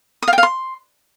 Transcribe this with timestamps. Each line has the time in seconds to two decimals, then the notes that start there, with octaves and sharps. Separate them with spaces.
0.22 D#6
0.28 F5
0.33 G5
0.38 F5
0.43 C6